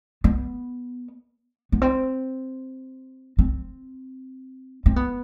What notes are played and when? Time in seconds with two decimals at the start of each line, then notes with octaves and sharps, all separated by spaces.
0.24 B3
1.72 B3
1.82 C4
3.39 C4
4.86 C4
4.96 B3